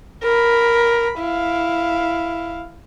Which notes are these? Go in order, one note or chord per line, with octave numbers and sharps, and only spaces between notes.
A#4 B5
E4 F5